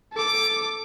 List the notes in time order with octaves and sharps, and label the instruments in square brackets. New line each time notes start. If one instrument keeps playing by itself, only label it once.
[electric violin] A4 D6